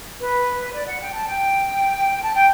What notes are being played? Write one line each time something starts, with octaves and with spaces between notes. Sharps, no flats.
B4
B4
D5
F#5
G5
A5
G5
A5
G5